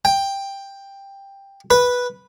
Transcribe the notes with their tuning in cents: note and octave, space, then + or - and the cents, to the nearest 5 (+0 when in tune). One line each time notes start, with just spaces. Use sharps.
G5 +10
B4 -5